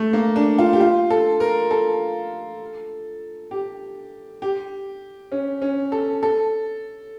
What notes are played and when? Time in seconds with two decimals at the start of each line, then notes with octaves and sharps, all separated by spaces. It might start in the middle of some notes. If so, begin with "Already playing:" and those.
Already playing: A3
0.13 A#3
0.36 D4
0.58 F4
0.73 G4
0.80 F4
1.10 A4
1.40 A#4
1.71 A4
3.51 G4
4.42 G4
5.32 C#4
5.62 C#4
5.92 A4
6.23 A4